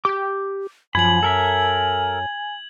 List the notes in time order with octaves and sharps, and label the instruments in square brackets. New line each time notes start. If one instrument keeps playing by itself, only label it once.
[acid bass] G4 [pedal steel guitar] D6 G6
[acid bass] F#2 [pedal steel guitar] F3 B5 [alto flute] G#5 [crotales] G#6 F#7
[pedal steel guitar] A4 A#4 E5